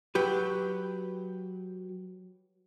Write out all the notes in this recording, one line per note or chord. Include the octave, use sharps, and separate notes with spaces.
F#3 G4 B4